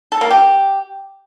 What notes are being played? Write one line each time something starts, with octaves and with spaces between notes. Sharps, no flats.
A4
A#3
G4